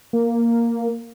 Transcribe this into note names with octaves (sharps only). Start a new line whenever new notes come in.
A#3